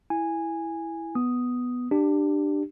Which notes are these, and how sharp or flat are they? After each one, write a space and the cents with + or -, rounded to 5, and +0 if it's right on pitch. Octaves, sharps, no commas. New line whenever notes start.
E4 +0 G#5 -10
B3 +0 D#6 +0
D4 +20 G4 +0